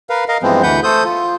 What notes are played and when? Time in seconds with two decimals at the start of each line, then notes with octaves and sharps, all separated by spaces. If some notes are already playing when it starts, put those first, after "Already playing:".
0.10 A#4 B4 F5
0.28 A#4 D#5 F5
0.43 G2 E3 F3 G#3 B3 C4
0.63 D2 E3 B4 F#5 G6
0.83 A3 A4 C5 D#6 G6
1.05 F4